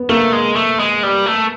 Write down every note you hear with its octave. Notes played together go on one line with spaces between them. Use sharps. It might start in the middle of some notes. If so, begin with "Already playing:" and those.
Already playing: B3
A3 A#3
G#3
A3
G#3
G3
A3